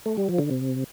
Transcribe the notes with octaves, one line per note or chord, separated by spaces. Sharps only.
A3
G3
F3
D3
C3